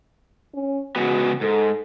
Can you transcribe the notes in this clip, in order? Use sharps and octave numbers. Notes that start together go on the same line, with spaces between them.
C#4
C#3 G#3 B3 F#4
G#2 A4